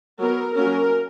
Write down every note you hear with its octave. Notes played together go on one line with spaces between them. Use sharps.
F#3 B3 A#4
F#3 A#3 C#4 A#4